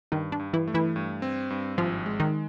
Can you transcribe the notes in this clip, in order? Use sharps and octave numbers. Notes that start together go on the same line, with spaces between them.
G2 D#3 D#4
D4
G2
E3 E4
A3
E3 E4
G2
C4
G2
G#1 F3 F4
G#3
D#3 D#4